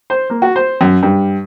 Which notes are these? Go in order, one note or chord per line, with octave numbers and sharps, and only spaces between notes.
C5
A#3
F#4
C5
F#2
G2